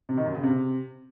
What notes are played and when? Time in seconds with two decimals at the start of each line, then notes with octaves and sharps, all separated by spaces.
0.09 C3
0.17 D#3
0.26 F#2
0.35 C#3
0.43 C3